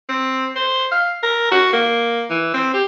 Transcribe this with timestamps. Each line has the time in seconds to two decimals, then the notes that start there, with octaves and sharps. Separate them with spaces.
0.09 C4
0.56 C5
0.91 F5
1.23 A#4
1.51 F#4
1.73 A#3
2.30 E3
2.54 C4
2.73 G4